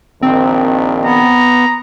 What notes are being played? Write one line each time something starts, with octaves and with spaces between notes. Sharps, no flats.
A#1 D#3 C4
B3 A#5